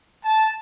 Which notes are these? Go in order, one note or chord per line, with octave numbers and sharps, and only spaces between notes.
A5